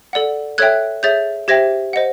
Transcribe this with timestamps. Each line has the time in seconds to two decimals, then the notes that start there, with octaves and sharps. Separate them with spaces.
0.13 A4 D5 F#5
0.58 A4 C#5 E5 G5 F#6 G#6
1.03 G#4 C#5 E5 G6 A6
1.48 G4 C5 E5 G5 G#6 A#6
1.93 C5 D#5 F#5